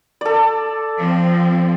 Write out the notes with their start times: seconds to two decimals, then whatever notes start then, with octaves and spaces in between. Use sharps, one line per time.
0.21 A4 D5
0.99 F3 C4